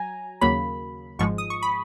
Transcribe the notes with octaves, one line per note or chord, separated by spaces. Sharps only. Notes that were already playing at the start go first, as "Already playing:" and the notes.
Already playing: F#3 G#5 A#5
D#2 C#3 F#3 A#3 B5
G#1 G#2 F3 G#3 C#6
D#6
C#6
B5